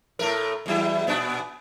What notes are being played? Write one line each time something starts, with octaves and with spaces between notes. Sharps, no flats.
A2 A3 A#4
E2 F#3 E4
A#2 B3 D4